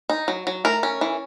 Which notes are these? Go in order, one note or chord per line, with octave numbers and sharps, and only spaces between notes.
D#4
F#3
F#3
A3 A#4
C#4
E3